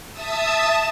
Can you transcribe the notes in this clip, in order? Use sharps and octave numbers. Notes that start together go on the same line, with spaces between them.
E5 A5 D#6 E6